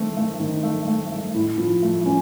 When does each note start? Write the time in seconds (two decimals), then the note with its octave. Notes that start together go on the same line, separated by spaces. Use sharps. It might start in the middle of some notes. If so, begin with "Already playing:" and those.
Already playing: D#3 A3 C4
0.17 A3
0.40 D#3
0.63 A3
0.88 A3
1.12 A3
1.34 A2
1.58 F3
1.83 A3
2.06 C#4